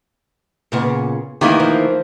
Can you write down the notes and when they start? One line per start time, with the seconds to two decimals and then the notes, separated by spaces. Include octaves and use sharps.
0.72 A#2 C#3 B3
1.41 D2 D#3 E3 A#3 G4
1.60 F3